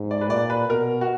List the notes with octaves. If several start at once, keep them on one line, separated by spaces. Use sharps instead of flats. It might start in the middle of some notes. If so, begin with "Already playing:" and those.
Already playing: G#2
D5
B4
A#2 D5
B4
B2 A#4
F#4